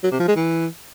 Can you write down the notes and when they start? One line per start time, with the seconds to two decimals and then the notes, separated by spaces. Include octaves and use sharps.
0.04 F#3
0.12 C3
0.20 F3
0.28 G#3
0.36 E3